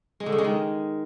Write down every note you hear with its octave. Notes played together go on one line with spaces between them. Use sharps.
G#3
D3
C#3
G#3
D#3